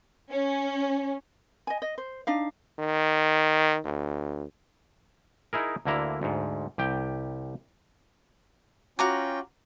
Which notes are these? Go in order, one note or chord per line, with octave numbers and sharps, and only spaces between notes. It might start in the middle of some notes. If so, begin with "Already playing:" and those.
C#4
D#5 G#5
D#5
C5
D4 D#4 F5
D#3
D2
D#4 E4 G#4 A#4
D2 D3 A#3 E4 A#5
D2 G#2
C2 G4 G5
C#4 F4 F#4 G5 A#5 D6